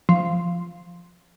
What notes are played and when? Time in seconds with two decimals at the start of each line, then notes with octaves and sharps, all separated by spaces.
0.09 F3